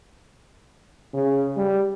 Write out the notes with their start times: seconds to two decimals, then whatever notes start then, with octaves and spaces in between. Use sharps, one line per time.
1.14 C#3
1.57 G3